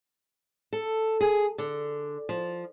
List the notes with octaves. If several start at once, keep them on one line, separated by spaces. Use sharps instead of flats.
A4
G#4
D3
F3